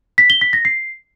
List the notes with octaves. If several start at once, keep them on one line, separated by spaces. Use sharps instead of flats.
B6
G7
B6
A#6
C7